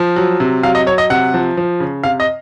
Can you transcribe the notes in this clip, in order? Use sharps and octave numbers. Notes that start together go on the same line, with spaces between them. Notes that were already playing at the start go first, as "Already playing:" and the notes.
Already playing: F3
F#3
C3
F#3 F5
D#5
F#3 C#5
D#5
C3 F#5
F3
F3
C#3
C3 F5
D#5